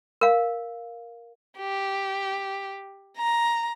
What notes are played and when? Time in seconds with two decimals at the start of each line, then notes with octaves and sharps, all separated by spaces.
0.21 A#4 F5
1.58 G4
3.17 A#5